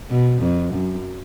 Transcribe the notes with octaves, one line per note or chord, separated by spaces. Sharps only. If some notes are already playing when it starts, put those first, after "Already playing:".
B2
F2
F#2